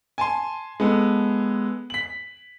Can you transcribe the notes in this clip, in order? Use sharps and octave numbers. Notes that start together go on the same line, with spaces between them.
G#5 A5 C6
G#3 B3 A4
B6 F#7